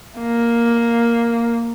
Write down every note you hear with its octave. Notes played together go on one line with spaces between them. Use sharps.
A#3